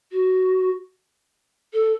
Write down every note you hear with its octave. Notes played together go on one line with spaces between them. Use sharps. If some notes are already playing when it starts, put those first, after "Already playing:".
F#4
A4